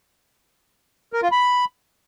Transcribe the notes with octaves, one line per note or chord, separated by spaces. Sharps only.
A#4
F4
B5